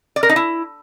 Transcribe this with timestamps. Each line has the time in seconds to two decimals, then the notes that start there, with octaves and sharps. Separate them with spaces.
0.16 D5
0.23 A#4
0.29 D#4
0.36 E4